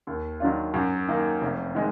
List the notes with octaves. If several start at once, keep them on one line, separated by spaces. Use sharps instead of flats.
D#2
D#3 F#3 D4 F4
F#2
D#3 A#3
F1
D#3 G#3